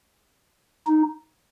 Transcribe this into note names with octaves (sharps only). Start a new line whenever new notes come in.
D#4